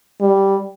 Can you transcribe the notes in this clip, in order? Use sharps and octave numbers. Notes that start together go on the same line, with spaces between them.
G3